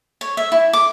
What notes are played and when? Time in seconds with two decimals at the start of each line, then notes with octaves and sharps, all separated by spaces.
0.21 C#5
0.37 E5
0.52 E4
0.73 D6